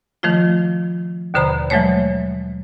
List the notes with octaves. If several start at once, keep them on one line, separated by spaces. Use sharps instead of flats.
D#3 F3 A3 F4
D#2 B2 D3 C5 A#5 B5
E3 F#3 G#3 A3 C#5